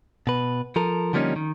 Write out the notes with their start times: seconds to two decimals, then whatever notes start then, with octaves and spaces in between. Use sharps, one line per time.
0.27 B2 B4
0.76 F3 A4 A#4
1.13 D3 F3 G3 A#3 C#4 D#4
1.36 D#3